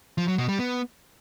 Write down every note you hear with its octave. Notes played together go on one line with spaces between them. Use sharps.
F3
F#3
B2
G3
B3